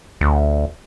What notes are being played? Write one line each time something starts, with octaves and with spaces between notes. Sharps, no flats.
D2